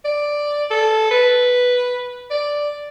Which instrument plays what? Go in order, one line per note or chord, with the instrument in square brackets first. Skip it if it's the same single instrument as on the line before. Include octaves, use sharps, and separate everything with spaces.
[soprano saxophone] D5
A4
B4
D5